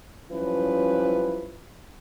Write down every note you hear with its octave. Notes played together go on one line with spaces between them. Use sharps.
G2 F3 F#3 C#4 E4 B4